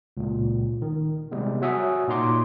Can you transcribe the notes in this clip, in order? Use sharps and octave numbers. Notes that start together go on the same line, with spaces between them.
C#2 A#2
D#3
C3 G3 G#3 B3
F#4 C#5 E5 F#5 G#5 D#6
A#2 A#3 D#4 A#5 C6 D6